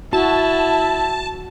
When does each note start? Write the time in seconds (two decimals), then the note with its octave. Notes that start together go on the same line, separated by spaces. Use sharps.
0.13 E4 F#4 A5